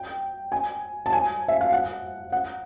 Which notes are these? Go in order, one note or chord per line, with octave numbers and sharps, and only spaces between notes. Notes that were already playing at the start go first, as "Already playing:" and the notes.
Already playing: G5
G#5
A5
G#5
E5
F5
F#5
F#5